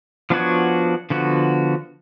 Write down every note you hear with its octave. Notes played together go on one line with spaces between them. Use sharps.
F3 B3 D4 F#4 C#5
D3 F3 B3 F#4